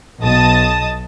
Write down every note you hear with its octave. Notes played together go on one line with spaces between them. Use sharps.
B1 D#5 A5 D#6 A6